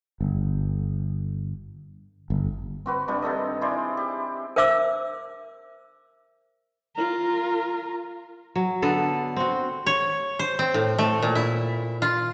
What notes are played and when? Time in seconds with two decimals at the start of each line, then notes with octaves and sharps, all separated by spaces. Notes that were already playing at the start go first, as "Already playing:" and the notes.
0.21 G1
2.30 G1
2.86 C4 F#4 B4
3.08 G2 C3 G3 D4
3.22 C3 D#3 A4 D#5
3.61 E4 G#4 C5 D5
3.97 G4
4.56 A#4 C5 E5 D6 E6
6.96 F4 A#4
8.56 F#3
8.82 D3 B3 A4
9.36 C4 F#4
9.86 C#5
10.39 C5
10.59 C4
10.74 A2
10.99 A3
11.22 A#2
11.35 E4
12.02 F4